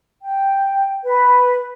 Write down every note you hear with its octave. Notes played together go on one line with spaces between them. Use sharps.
G5
B4